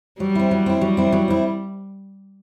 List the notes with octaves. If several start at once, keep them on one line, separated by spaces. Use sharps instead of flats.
F#3 G3
C4 E4
F#3
C4 E4
F#3 G3
C4 E4
F#3
C4 E4